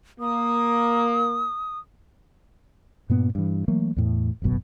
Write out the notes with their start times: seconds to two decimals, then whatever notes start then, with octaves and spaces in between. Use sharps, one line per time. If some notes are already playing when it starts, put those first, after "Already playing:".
0.20 A#3 D#6
3.10 G2 A#2 B3
3.35 G2 E3
3.68 E3 F#3 A3 A#3
3.96 E2 A2
4.42 D1 G1 F#2 B2